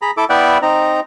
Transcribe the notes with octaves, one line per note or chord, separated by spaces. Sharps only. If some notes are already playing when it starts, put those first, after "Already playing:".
G#4 A#5 B5
E4 A4 D6
B3 E4 D5 E5 F#5 G5
C4 D#4 A#5